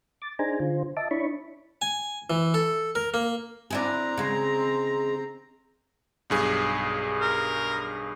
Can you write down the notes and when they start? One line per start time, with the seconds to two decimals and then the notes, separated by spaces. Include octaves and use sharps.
0.22 D6 A6
0.39 D4 D#4 G#4 C5 G#5 A#5
0.60 D3 F4 C5
0.97 D#5 E5 A5 D6
1.11 D4 E4 C#5 B5 C#6
1.82 G#5
2.30 E3
2.54 A4
2.95 A#4
3.14 A#3
3.71 C4 D4 E4 G#4 A#5
4.18 C#3 G#3
6.30 B1 G2 G#4
7.21 A#4